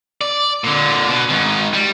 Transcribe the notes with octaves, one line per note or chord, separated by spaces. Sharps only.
D5
A#2 D3
B2
G#2 D#3
G3